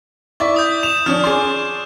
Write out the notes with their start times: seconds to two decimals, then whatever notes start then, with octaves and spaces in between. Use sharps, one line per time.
0.40 E4 D5 E5 C#6
0.56 D#6 G6
0.83 E7 F7
1.06 F3 C#4 D4 F6 G6
1.24 G#4 D5 C6